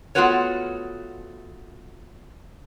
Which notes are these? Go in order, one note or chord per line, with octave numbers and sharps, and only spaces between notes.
A3 B3 F4 F#4 B4 C#5